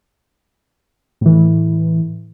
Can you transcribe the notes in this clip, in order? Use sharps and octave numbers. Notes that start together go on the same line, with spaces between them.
A2 E3